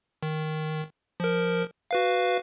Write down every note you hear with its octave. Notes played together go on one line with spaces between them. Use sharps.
D#3
F3 A#4
F#4 B4 F5